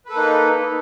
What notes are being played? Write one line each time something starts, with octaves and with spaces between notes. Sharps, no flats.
A#3 D#4 A4 B4